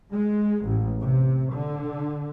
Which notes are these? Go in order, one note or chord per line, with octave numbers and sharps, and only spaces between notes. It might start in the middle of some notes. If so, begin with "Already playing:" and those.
G#3
A1
C3
D3